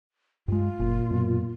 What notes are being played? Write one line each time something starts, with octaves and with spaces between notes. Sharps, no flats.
G2 G#3 F4
F#1 A#2
F#2 B2